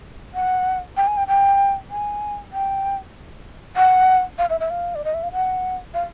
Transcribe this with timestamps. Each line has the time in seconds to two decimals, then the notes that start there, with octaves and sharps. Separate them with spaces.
0.34 F#5
0.97 G5
1.07 G#5
1.17 G5
1.28 G5
1.90 G#5
2.52 G5
3.76 F#5
4.38 F5
4.50 E5
4.60 E5
4.70 F5
4.95 D5
5.05 D#5
5.14 E5
5.23 F5
5.32 F#5
5.94 F5